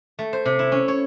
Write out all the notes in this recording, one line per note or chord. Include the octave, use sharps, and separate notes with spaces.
A3
C5
C3
E4
C#4
C#5